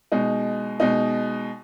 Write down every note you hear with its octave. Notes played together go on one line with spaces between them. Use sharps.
B2 G#3 D#4
B2 G#3 D#4